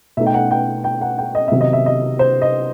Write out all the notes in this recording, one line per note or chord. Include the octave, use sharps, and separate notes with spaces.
B2 A3 D#4 E5
G5
F#5
G5
G5
F#5
G5
D#5
C3 D#3 F#3 B3 D#4 E5
D#5
E5
D#5
C5
D#5